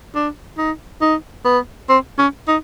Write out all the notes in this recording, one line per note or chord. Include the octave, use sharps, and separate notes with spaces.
D4
D#4
D#4
B3
C4
C#4
D#4